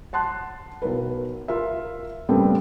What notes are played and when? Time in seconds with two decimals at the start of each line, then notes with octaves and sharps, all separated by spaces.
0.13 F#5 A5 C6 F#6
0.82 B1 A#4 B4
1.48 F4 A#4 E5
2.29 A#2 C#3 G3 A3 B3 C4